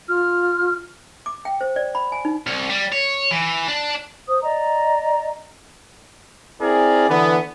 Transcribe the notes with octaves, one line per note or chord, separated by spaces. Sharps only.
F4 F6
D6
G5
C5
D5
B5
G#5
D#4
C2
G3
C#5
E3
D4
C5 D#6
D5 D#5 A#5
C4 E4 G#4 A#4 D5
D3 E3 B3